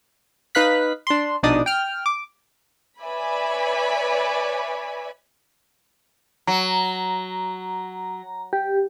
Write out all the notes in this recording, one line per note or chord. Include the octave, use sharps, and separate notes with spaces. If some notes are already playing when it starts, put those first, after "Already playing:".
D#4 B4 F5 F#6 B6
D4 C6
A#1 B2 D4 D#4 D5 D#6
G5 F6
D6
B4 C#5 D5 E5 G#5 B5
F#3 A#5
G4